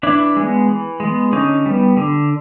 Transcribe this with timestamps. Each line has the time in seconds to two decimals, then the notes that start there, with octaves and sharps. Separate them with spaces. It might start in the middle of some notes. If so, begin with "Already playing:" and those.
0.03 E3 D4 E4
0.37 G#3 B3
0.68 E3
1.00 G#3
1.06 B3
1.32 D3 C#4 D#4
1.66 G3 B3
1.97 D3